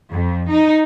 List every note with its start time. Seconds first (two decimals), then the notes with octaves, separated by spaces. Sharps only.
0.10 F2
0.50 D#4